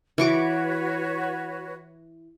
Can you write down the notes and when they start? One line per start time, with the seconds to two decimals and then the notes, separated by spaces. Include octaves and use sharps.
0.18 E3 F#4 B4 C#5 C#6 D6